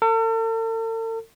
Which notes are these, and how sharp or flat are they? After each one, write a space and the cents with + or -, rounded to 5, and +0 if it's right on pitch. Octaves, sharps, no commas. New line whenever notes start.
A4 +45